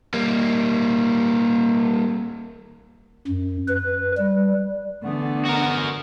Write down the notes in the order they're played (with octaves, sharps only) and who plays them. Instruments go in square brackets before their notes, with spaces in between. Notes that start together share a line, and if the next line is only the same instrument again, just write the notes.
[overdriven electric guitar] G3 A#3
[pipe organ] F#2
B4
G3
[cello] D3 [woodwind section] E3 A3 B3
[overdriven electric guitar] F#4 A#4